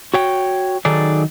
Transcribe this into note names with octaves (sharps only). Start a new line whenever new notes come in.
F#4 C#5 G5
D#3 F#3 D#4 G#4 A4 D5